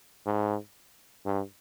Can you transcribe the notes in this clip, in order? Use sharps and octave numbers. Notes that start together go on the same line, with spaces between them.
G#2
G2